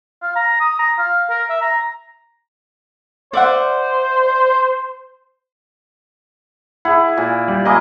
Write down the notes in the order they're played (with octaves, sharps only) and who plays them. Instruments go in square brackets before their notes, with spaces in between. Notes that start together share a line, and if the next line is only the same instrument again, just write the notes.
[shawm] F5
A#5
D#6
A#5
F5
A#4
E5
A#5
[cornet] C5 [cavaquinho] D5 E5 F#5
[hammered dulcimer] E4 [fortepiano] G#4 F#5
[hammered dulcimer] A#2
[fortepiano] G3
[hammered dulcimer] A#3 E4 G#4 [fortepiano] D#5 D6 D#6